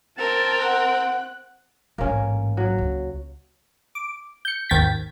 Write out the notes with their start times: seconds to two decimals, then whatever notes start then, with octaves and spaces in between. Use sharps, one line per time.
0.18 C4 A#4 A5
0.63 F#5 F#6
1.98 A1 G#2 A#3 C#4
2.57 F#3
2.78 C#2
3.95 D6
4.45 G6 C#7
4.69 G#1 D#2 G5 G#6 A6 B6